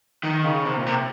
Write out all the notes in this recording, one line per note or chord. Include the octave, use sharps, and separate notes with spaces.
D#3
C#3
C3
A#2
C3